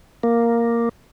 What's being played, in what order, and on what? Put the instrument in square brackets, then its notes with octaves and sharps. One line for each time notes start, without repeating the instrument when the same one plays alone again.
[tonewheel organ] A#3